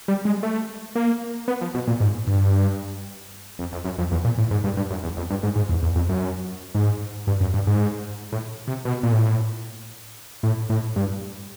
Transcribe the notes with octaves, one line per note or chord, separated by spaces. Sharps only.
G3
G#3
A3
A#3
B3
F3
B2
A#2
G#2
G2
F2
F2
F#2
F2
E2
A#2
A2
G#2
G2
G2
F#2
E2
F2
G2
G#2
G#2
E2
E2
F2
F#2
G#2
G2
F#2
G2
G#2
A2
C3
B2
A#2
A2
A2
A2
G2